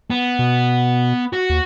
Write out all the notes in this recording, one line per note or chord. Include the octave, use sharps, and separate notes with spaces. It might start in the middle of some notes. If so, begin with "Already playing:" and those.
B3
B2
F#4
D#2